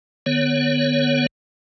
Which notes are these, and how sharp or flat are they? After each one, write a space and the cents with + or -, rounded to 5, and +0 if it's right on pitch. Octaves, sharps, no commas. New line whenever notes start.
D3 +40 B3 +0 C#5 +0